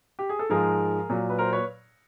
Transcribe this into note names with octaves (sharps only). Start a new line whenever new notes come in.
G4
G#4
A4
G#2 F3 G#3 G#4 A#4
A#2 F#3
B4
A#4 C5
B4 C#5